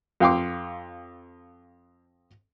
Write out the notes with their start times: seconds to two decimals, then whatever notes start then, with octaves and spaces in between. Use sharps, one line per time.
0.20 F2 F5 G5 C6 D6